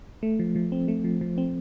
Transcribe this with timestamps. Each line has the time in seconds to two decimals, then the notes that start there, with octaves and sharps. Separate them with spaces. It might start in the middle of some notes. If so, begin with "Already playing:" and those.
0.23 A3
0.39 F3
0.56 F3
0.72 C4
0.88 A3
1.04 F3
1.21 F3
1.38 C4